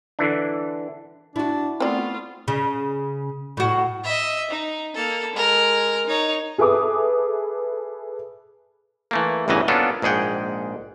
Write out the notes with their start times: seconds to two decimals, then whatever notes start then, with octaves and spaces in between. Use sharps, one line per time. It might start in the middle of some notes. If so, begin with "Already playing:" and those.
0.19 D3 E3 D4
1.36 D4 E4 F#4
1.80 A3 B3 C4 F4 D5
2.48 C#3
3.57 A2 F#4
4.04 D#5 E5
4.50 D#4
4.95 A#3 A4
5.33 G#3 A#4
6.07 D#4 C#5
6.58 G#4 A4 B4 E5 D6 D#6
9.11 E3 A3 A#3
9.48 A1 E2 G2 C#3 E3 D#5
9.68 A#3 B3 C#4 D4 F4 A4
10.02 A#1 G#2 G#4 F#5 G5